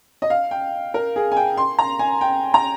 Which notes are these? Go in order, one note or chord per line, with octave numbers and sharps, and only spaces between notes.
D#5
F5
G5
A#4
G#4
G#5
G5
C6
A#5
G#5
G5
A#5